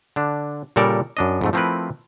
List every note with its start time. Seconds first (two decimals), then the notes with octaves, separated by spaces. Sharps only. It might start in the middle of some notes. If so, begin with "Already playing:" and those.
0.16 D3 D4
0.76 A#2 C#3 G3 A4 A#4 D5
1.17 F#2 D4 D#5
1.41 F2 G#2 A3
1.53 F3 A3 C4 E4 A#4 B4